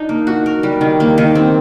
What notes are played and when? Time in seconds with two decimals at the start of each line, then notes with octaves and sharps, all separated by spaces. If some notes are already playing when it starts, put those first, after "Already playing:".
Already playing: D4 D#4
0.09 A#3
0.27 F#4
0.46 A#4
0.63 G3
0.81 D#3
1.00 A#3
1.18 D#3
1.35 C4